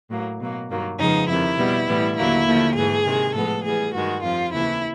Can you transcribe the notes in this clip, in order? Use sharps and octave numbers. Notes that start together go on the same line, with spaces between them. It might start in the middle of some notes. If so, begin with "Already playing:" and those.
A2 F#3 A#3
B2 F#3 A#3
G2 D#3 F#3 A#3
F2 C#3 F3 G#3 B3 D#4
F2 C3 D#3 E4
B2 G3 B3
A2 E3 G3 B3
D#2 D3 F#3 A#3 E4
D#2 D3 F3 A3
G#2 E3 A3 G#4
C3 D#3 G#3
A2 F3 G#3 B3 A4
A2 E3 G3 B3 G#4
G2 D#3 G#3 F#4
F2 C3 F3 F4
D#2 C#3 E3 A3 E4